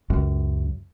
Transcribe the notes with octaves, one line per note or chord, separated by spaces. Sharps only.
C#2 F#2